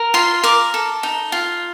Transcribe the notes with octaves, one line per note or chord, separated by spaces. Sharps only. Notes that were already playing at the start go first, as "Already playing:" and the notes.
Already playing: A#4
F4 C6
A#4 D6
A4
D#4
F4